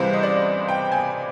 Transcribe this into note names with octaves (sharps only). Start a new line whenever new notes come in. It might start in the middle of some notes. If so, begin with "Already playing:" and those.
Already playing: C#2 C3 E3 G3 C5
D#5
D5
G5
G#5